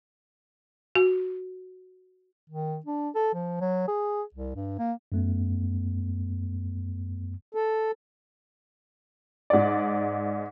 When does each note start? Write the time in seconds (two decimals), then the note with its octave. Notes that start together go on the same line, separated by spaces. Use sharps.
0.95 F#4
2.50 D#3
2.86 D4
3.15 A4
3.34 F3
3.61 F#3
3.88 G#4
4.34 C2
4.55 G2
4.79 A#3
5.12 F#2 A3 B3
7.55 A4
9.50 G#2 D5